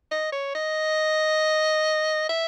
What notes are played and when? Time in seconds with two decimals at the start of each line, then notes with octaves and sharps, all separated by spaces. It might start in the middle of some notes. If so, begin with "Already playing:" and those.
0.11 D#5
0.32 C#5
0.55 D#5
2.29 E5